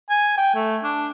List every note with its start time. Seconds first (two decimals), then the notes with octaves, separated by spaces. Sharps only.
0.10 G#5
0.38 G5
0.55 A3
0.84 D4